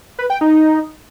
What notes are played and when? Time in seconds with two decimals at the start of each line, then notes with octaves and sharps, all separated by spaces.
0.19 B4
0.30 G5
0.41 D#4